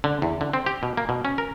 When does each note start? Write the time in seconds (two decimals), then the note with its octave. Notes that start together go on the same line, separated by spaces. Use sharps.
0.04 D3
0.22 E2
0.41 D3
0.53 C4
0.66 G4
0.83 B2
0.97 A#3
1.09 B2
1.25 C#4
1.38 A#4